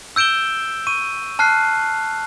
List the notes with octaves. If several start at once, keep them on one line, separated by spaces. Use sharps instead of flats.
E6 G6 D7 E7 G7
C#6 D#7
A5 F6 F#6 C7